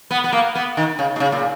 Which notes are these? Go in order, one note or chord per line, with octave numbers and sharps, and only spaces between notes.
B3
B3
A#3
B3
D#3
C#3
B2
C#3
A#2